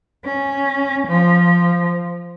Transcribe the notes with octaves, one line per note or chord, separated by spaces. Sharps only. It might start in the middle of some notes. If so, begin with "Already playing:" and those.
C#4
F3